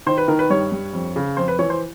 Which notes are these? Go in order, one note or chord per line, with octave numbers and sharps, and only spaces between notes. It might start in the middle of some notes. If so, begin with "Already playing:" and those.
D#3 C5
B4
D#3 A#4
B4
G2 C#5
G2
F2
C#3
F2 C5
B4
E3 C#5
C5